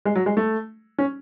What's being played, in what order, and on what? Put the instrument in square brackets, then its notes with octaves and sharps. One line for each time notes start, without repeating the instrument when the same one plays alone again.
[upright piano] G#3
F#3
G#3
A3
C#4